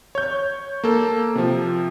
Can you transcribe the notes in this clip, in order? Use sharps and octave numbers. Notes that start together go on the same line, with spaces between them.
C#5 G6
A#3 A4
C3 F3